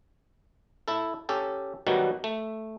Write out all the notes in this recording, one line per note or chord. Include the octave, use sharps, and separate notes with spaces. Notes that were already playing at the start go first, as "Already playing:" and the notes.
E4 A4
C#4 G4 A4
B2 D#3 F#3 G3 F#4
A3